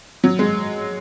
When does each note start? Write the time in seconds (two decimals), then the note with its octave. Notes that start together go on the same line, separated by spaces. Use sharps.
0.24 F#3
0.39 G#3